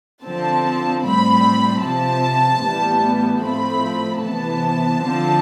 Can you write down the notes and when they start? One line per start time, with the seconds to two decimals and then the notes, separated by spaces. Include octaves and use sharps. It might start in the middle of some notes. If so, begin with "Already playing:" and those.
0.23 D3 F3 C4 A5
1.03 A2 G3 C4 B5
1.82 C3 F3 C4 A5
2.62 A2 E3 G3 B3
3.42 A2 F3 A3 C4 B5
4.21 C3 E3 B3 A5
5.00 D3 F3 C4